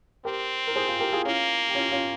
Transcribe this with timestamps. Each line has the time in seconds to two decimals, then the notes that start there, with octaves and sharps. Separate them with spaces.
0.25 C4 G4 A#4
0.67 A#4
0.76 G#4 C5
0.88 F4 G#4
1.00 G4 A#4
1.12 F4 G#4
1.25 A#3 C#4 F4
1.70 G4
1.75 C#4 F4
1.91 C#4 F4